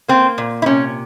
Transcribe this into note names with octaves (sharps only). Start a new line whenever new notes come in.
A#3 C4
A#2
E4
C3 C#4